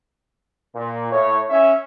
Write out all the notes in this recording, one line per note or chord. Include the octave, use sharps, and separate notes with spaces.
A#2
A2 C#5
C#4 E5